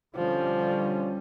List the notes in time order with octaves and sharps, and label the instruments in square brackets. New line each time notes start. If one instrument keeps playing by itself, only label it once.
[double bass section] D3 G3 C#4 [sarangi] F3